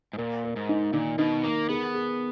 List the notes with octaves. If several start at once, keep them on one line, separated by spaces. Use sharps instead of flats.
G#2
A#2 A#4
A#4
G#2
D#4
A#2 D#3
B2 D#4
A#3 A#4
B3 G#4
G#4